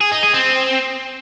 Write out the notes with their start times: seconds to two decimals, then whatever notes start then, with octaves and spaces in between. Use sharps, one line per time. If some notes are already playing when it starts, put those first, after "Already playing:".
0.01 G#4
0.12 D#4
0.23 G#4
0.34 C4